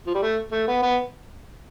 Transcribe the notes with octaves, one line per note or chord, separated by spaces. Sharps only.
F3
G3
A3
A3
B3
B3